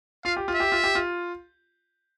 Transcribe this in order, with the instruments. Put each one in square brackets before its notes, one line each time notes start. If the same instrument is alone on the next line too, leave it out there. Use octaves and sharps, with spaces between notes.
[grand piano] F4 [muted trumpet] F5
[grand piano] G4
F4
[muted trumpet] E5
[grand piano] G4
F4
G4
F4